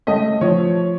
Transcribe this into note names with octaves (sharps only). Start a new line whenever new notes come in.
A3 D#5
F3 C#5